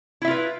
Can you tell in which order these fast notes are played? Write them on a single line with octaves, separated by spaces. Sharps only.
E4 E5 F4 B4